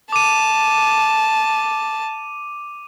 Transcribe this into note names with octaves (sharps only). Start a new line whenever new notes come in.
A5 D6 D#7